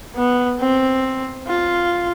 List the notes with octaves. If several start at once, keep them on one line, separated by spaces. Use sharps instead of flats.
B3
C4
F4